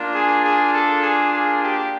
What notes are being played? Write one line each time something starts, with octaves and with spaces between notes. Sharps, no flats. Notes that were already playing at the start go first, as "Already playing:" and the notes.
Already playing: A#3 D4 F4
G#4
G#4
A4
G#4
G#4
G4